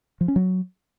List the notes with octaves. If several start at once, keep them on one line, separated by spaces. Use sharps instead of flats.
F3
C#4
F#3